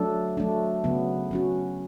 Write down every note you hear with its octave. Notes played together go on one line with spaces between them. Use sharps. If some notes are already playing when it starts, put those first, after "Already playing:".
Already playing: F#3 A3 D4 A4
F#3 A3 D4
C#3 F#3 B3
F#3 C#4 F#4